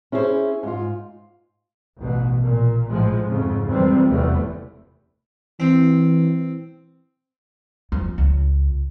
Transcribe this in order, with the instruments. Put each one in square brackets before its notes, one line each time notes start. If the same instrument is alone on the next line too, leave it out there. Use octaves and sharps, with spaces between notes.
[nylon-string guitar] C#4 E4 G#4 A#4 C5
G#2 F4
[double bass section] A1 B2
A#2
A#1 A2 F3 G#3
F2 G#2 C#3
F2 C3 E3 G3 G#3 C4
F1 E2 C3 E3 G3 A3
[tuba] E3 [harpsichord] C4
[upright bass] F2
C#2